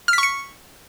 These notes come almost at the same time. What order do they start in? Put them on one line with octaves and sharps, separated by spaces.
F6 B6 C#6 C#7